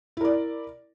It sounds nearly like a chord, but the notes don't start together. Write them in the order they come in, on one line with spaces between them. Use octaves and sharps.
E4 A#4 D5